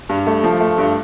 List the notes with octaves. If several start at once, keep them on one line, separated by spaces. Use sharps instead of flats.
G2
A3
F3
A3
G2